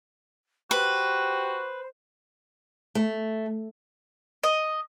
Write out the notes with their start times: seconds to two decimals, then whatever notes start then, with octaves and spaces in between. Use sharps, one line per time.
0.71 F#4 G4 B4 C5
2.95 A3
4.44 D#5